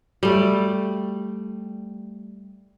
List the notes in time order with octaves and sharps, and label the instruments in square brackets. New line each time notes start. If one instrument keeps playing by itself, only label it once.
[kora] G3 A3